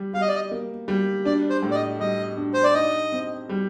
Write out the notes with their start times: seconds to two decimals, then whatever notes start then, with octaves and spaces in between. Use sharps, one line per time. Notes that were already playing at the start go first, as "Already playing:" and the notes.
Already playing: G3
0.13 G3 F5
0.21 D#5
0.28 D5
0.35 D#5
0.51 A#3
0.88 G3
1.25 D4 D5
1.50 C5
1.63 A2
1.71 D5
1.75 D#5
2.00 G3 D#5
2.38 D4
2.54 C5
2.63 D5
2.74 D#4 D#5
3.12 C4
3.49 G3